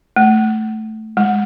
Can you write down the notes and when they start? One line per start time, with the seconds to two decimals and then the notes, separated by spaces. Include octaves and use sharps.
0.16 A3
1.17 G#3